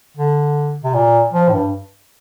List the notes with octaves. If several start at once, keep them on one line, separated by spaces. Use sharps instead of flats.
D3
C3
A#2
F3
A2
G2